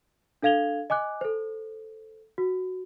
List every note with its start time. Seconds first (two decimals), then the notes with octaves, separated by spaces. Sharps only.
0.42 D4 A4 F5 G#6 F7 G7
0.90 D#5 G#5 D6 F#6
1.21 A4 C5
2.38 F#4